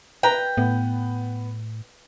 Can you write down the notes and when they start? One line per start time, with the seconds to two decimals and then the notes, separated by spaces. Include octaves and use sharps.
0.23 B4 G5 A#5
0.57 A2 B3